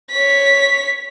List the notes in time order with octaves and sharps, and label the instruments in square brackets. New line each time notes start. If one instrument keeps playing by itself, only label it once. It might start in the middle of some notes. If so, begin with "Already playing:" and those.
[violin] C#5 B6